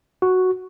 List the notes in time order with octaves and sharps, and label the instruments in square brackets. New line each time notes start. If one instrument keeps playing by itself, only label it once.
[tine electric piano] F#4